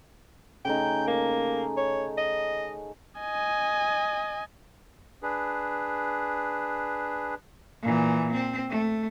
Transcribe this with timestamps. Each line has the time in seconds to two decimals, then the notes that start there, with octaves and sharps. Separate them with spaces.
0.65 C#3 A3 D#4 G5
1.07 A#3
1.77 C#5
2.18 D#5
3.20 D#5 G#5
5.23 D4 G#4 B4
7.83 A#2 E3
8.33 C4
8.70 A3